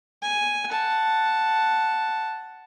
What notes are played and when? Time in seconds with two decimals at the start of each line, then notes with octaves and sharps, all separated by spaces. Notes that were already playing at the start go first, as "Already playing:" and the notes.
0.23 G#5
0.70 F#5 A5